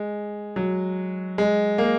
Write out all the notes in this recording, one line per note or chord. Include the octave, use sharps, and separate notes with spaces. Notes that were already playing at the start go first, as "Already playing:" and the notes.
Already playing: G#3
F#3
G#3
A#3